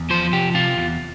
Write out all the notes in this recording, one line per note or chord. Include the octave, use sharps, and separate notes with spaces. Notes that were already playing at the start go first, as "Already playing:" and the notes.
Already playing: E2
F3 C5
C3 G4
C3 F4
E2